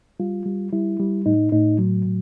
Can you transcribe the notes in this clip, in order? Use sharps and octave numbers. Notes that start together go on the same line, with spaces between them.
G3 F4
G3
G3 E4
G3
A2 D#4
A2 D#4
F#3
A2